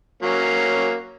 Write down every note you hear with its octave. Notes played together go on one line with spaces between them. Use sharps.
F#3 A#3 C#4